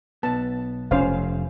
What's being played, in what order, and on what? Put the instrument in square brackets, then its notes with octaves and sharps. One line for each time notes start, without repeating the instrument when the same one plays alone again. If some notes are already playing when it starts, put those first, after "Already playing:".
[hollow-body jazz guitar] B1 B3 [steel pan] A5
[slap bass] F1 [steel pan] C#4 C5 F5